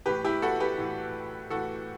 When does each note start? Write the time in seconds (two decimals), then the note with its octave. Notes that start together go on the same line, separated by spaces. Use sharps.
0.06 A2 E3 G4 B4
0.24 E4 G4
0.42 F#4 A4
0.60 G4 B4
0.78 A2 E3
1.50 A2 E3 F#4 A4